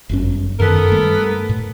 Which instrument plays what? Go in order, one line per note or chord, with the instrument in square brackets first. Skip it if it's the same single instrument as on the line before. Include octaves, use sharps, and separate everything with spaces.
[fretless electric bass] G1 F#2 C#4
[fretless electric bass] F#2 D#3 [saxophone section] B3 A4 A#4
[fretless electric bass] G2 A3
A2